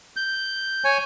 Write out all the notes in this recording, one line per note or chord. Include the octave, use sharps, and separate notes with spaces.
G6
C#5 G#5